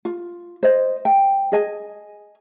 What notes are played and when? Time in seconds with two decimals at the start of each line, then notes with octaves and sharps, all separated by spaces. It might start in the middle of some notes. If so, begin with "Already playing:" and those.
0.05 F4
0.63 C5 D#5
1.05 G5
1.52 G#4 D#5 G#5